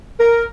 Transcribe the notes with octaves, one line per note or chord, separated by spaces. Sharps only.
A#4